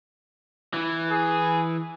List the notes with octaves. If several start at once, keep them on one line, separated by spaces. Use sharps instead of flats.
E3
G#4